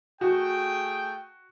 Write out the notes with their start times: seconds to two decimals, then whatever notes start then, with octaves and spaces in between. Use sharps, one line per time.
0.21 A3 F#4 G#4 G5